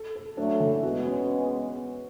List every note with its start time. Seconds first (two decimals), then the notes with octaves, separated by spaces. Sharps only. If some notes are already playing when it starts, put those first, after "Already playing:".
Already playing: A4
0.16 A4
0.37 F#3 A3 D4
0.60 E3
0.83 G#3 B3 F#4
1.06 C#4